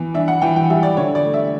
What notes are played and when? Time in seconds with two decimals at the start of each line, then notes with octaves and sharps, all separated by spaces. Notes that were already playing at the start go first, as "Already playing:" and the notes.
Already playing: E3 B3
0.14 D4 E5
0.28 F#5
0.41 E3 G5
0.56 G5
0.70 G3 E5
0.83 D5
0.97 D3 C#5
1.15 D5
1.25 A3
1.34 E5